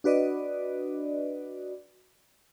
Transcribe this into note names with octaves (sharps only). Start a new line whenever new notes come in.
D4 F#4 B4 D5 D#5